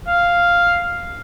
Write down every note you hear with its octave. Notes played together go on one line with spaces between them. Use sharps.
F5